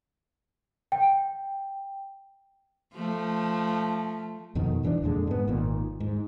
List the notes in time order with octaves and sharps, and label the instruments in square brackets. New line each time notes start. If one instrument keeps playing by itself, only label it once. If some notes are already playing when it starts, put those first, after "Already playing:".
[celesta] G5
[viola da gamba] F3 A3
[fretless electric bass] F2 B2 D#3
D1 E3 C#4 D4
F2 A#2 D3 G#3
G#2 B3
G#1 A#2 D#3
G#2